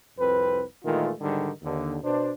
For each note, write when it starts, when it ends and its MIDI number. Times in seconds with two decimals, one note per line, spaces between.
0.19 0.63 36
0.19 0.63 41
0.19 0.63 60
0.19 0.63 71
0.85 1.11 46
0.85 1.11 51
0.85 1.11 52
0.85 1.11 56
0.85 1.11 57
0.85 1.11 65
1.21 1.50 44
1.21 1.50 50
1.21 1.50 51
1.21 1.50 55
1.63 1.96 39
1.63 1.96 50
2.03 2.30 47
2.03 2.30 62
2.03 2.30 72